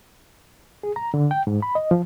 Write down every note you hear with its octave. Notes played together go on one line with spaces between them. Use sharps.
G#4
A#5
D3
G5
G#2
B5
D#5
F3